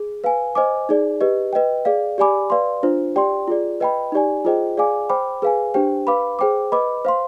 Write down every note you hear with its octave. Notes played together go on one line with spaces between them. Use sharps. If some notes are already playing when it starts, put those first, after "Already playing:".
Already playing: G#4
B4 F5 G#5
C5 D#5 G#5 D6
D#4 G#4 D5
G4 B4 D#5
B4 D#5 G5
G#4 D5 F5
G4 D5 G#5 B5 D6
B4 D5 F5 C6
D4 F4 C5
G4 D5 G5 C6
F4 G#4 D5
B4 D#5 G5 B5
D#4 G4 D5 G#5
F4 G#4 C5 D#5 G5
G#4 D5 F5 G#5 D6
C5 G5 B5 D6
G#4 B4 F5 G#5
D4 G4 C5 G5
B4 F5 B5 D6
G#4 C5 G5 D6
B4 D#5 B5 D6
C5 F5 C6